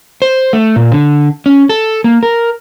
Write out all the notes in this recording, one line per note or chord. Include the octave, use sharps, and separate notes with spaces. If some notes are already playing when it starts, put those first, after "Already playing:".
C5
A3
A#2
D3
C#4
A4
A#3
A#4